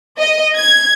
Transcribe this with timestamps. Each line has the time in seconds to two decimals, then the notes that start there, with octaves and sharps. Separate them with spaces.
0.18 D#5
0.56 G#6